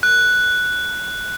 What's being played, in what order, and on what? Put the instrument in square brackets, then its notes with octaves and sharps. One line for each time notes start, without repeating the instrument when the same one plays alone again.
[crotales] F#6